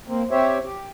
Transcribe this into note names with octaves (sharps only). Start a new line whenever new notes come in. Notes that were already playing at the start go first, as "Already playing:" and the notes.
A#3 C4
C4 G4 C5 C#5 E5
G4